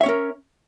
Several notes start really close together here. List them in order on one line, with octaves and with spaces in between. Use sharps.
E5 C#5 C#4 A#4